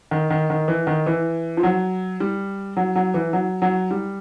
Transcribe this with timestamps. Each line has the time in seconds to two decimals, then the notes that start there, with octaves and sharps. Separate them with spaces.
0.11 D#3
0.30 D#3
0.50 D#3
0.68 E3
0.87 D#3
1.06 E3
1.57 F3
1.63 F#3
2.20 G3
2.77 F#3
2.95 F#3
3.14 E3
3.33 F#3
3.62 F#3
3.91 G3